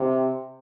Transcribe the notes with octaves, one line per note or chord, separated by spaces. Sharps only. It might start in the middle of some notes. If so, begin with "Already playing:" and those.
Already playing: C3